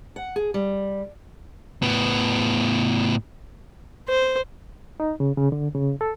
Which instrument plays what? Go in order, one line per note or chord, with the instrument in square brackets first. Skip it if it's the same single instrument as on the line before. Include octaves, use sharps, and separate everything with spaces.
[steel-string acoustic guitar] F#5
G#4
G3
[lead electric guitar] A2 B3
[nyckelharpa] C5
[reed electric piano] D#4
C#3
C#3
D3
C#3
A4